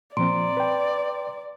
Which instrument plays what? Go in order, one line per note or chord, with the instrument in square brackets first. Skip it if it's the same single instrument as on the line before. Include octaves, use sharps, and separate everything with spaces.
[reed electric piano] A#2 F3 C4 [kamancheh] D5 [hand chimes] A#5 C6 D7
[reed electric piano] B4 G5